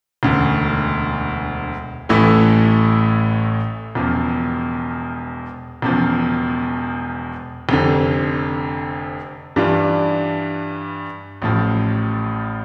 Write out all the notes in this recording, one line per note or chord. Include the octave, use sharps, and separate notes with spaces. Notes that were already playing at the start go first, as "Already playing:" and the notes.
E1 D2 C#3
A1 A2 E3 A3 E4
E1 E2 C#3 F3
E1 E2 C#3 F3
F1 F2 D3
G2 E3 G3 D4 F4
A1 A2 F3